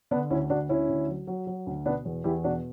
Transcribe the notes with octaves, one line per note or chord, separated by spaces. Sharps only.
D3 B3 D4
D2 C#4 E4
D2 D4 F#4
D2 C#4 E4
D2
F#3
F#3
F#3
D2
B2 B3 D4
E2
E2 E4 G4
B2 D4 F#4